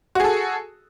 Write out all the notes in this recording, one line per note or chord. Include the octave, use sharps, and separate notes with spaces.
F#4 G#4 A4